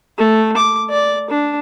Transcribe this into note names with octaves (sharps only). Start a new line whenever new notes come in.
A3
D6
D5
D4